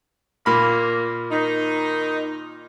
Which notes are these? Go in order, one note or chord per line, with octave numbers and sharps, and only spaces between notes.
A#2 A#3 B5
D#3 D#4